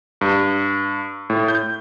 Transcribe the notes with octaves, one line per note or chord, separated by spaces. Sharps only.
G2
A2
G6